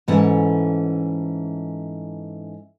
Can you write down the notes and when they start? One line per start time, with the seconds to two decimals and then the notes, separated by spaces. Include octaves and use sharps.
0.08 G#2 E3 A3 C#4 F#5